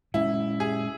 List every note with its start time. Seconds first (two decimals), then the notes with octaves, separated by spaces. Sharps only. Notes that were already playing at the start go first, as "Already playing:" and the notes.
0.14 A#2 G#3 C#4 E4
0.60 G#4